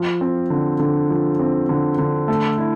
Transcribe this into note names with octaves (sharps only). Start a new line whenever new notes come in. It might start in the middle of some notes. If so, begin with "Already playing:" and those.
Already playing: F3
C4
D3
D3
F3
C4
D3
D3
A3
E4